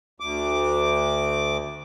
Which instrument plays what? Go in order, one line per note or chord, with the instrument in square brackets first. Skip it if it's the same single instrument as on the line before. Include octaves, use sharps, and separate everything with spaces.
[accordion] D2 D6